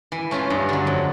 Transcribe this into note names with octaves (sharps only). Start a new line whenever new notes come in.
E3
A3 C#4 F4
G2
D3 F#3
F2